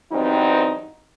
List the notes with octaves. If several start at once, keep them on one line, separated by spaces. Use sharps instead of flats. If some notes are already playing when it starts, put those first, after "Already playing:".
E2 G2 F#3 C4 D#4